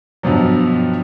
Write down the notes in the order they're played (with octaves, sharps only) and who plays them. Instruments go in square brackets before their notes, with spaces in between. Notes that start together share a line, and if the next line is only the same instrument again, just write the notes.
[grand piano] G2 B2 F3 F#3